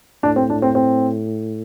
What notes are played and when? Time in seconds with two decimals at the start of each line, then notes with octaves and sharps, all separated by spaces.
0.23 A2 D4
0.36 C4
0.50 D4
0.62 C4
0.75 C4